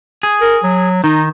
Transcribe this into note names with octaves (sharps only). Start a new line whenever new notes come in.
G#4
A#4
F#3
D#3 D#4